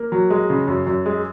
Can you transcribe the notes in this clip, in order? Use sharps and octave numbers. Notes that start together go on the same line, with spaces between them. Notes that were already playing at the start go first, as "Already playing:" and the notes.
Already playing: A#3
F#3
G#3
C#3
F#2
F#2
G#3